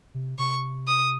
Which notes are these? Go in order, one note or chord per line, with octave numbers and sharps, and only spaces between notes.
C3
C3 C#6
D#6